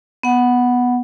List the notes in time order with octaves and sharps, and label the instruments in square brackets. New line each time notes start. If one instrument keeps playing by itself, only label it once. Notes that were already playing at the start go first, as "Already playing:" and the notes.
[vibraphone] B3 F#5